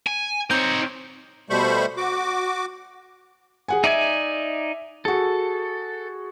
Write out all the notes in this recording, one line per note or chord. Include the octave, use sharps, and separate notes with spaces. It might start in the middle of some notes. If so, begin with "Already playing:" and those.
G#5
C4 D#4 C#5 G6
B2 G3 A3 C5 B5 C#6
F#4 D6
G#4 F#5 G#5
D#4 D5 E5 G#5
F#4 G#4 A4